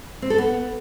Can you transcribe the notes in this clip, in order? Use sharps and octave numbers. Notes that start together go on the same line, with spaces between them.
C4
A4
B3